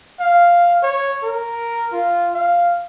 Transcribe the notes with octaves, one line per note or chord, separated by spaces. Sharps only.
F5
C#5
A#4
F4
F5